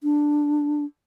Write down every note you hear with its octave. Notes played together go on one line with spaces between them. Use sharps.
D4